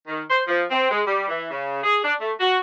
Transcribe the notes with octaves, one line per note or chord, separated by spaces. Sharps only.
D#3
C5
F3
C4
G#3
G3
E3
C#3
G#4
D4
A3
F#4